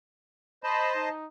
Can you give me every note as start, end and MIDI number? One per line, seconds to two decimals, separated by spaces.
0.64 1.09 72
0.64 1.09 75
0.64 1.09 81
0.64 0.94 83
0.95 1.27 63